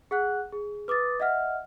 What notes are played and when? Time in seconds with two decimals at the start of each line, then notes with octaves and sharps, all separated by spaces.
0.11 G#4 F#5 F#6
0.53 G#4
0.88 B4 D6 D#6 A6
1.20 D#5 E5 F#5 F6